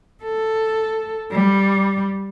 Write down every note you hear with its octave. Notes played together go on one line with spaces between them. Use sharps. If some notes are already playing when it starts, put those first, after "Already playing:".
A4
G3